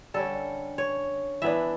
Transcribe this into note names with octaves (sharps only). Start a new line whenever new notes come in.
D3 G3 C#4 A4
C#5
E3 B3 D4 E5